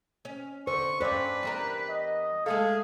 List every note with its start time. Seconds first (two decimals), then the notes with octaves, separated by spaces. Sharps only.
0.25 C#4
0.67 D3 C5 C#6
1.01 G2 C#4 B4 C5 D5
1.43 E2 G3 A#4
1.89 D#5
2.46 G#3 A3 G#4 A4 F5